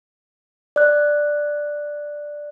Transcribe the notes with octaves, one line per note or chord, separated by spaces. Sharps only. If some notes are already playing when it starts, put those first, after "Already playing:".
D5 F#6